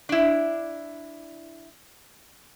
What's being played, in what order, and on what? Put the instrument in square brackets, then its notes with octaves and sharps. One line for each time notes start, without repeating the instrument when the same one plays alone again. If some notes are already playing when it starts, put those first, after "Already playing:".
[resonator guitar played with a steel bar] D4 E4